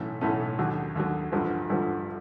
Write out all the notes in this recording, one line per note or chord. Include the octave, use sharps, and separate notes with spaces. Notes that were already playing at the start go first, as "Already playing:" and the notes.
Already playing: B1 A2 E3 A3 C#4
B1 A2 E3 A3 C#4
D#2 D3 F#3
D#2 D3 F#3
A1 G2 D3 F3
A1 G2 D3 F3